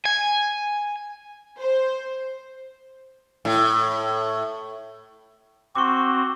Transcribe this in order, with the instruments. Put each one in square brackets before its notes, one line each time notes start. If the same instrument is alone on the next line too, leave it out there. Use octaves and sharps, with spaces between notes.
[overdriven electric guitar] G#5
[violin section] C5
[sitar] A2
[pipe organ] C4 F#4 [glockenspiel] C#6 D6